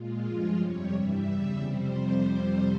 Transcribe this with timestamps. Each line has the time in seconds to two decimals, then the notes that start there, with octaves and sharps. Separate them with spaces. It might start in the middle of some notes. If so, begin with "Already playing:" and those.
Already playing: A#2 G#3 F4
0.24 G2 F3 G#3
0.59 F2 C3 G3 C#5
0.93 G2 E3 G3 E5
1.27 E2 C#3 G3 E5
1.62 F2 C3 G3 C5